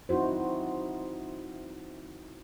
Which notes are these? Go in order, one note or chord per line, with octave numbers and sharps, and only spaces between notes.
C4 D#4 E4 F#4 C5